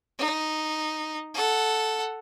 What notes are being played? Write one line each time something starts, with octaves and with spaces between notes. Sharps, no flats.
D#4
A4 F#5